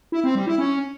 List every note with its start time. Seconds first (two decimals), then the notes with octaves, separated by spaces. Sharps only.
0.12 E4
0.24 C4
0.35 G3
0.47 E4
0.58 C#4